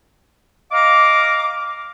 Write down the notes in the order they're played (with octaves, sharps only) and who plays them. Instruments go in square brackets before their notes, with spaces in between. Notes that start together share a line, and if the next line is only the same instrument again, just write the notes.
[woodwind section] D#5 F5 A#5 D6